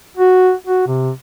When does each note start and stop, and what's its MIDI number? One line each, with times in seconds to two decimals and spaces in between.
0.17 0.52 66
0.67 0.84 66
0.87 1.10 48